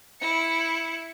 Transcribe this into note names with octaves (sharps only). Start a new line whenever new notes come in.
E4 C#7